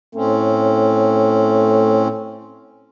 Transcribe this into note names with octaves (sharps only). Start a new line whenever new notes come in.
A2 A3 C4 C#4